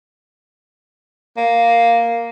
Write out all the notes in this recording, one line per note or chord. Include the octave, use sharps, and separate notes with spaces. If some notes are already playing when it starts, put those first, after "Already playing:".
A#3